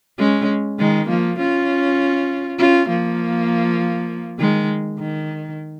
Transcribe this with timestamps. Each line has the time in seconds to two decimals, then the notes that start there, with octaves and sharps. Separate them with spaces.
0.19 G#3 C#4
0.79 D#3 G#3
1.09 F3 A#3
1.39 C#4 F4
2.59 C#4 F4
2.89 F3 A#3
4.39 D#3 G#3
4.99 D#3